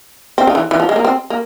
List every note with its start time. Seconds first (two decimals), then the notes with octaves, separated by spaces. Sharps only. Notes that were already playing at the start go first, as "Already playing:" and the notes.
0.38 C4
0.47 C#3
0.55 E3
0.71 E3
0.80 F3
0.89 G#3
0.96 A#3
1.05 C4
1.30 A#3